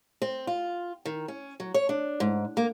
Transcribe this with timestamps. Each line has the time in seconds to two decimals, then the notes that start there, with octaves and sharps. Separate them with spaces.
0.22 C4
0.47 F4
1.05 D#3
1.28 C#4
1.60 F#3
1.74 C#5
1.89 D4
2.20 G#2
2.57 A#3